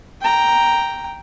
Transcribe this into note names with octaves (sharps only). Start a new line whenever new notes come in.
G5 A#5